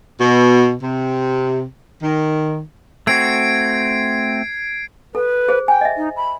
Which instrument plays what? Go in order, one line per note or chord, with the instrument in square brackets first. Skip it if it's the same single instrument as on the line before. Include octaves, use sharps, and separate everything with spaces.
[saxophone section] B2
C3
D#3
[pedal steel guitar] A3 C4 F#4 [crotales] G#6 C7 D7
[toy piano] A4 [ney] B4
[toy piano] G#4 C5
[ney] G5 [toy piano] G#5
[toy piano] D#5 E5
[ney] D#4
B5